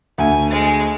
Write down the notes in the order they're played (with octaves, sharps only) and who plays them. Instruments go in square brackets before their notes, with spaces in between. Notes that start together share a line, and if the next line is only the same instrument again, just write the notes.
[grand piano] D2 [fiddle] G#5
[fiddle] G#3